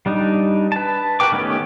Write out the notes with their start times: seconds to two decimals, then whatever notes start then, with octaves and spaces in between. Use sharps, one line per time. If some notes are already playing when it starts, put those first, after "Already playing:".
0.06 G3 D4 D#4
0.72 B4 A5
1.20 F#4 A#4 B4 G5 D6
1.32 D#3 A3 B3 C#4 G4